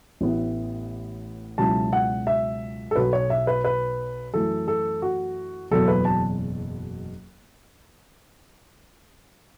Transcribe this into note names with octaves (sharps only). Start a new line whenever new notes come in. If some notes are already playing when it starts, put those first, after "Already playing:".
A1 A2 E3 B3 E4
C#2 B2 F#3 C#4 E4 A5
F#5
E5
A4
B1 B2 F#3 B4
C#5
E5
B4
B4
F#2 E3 A3 A4
A4
F#4
F#1 E2 B2 F#3 B3 A4
B4
A5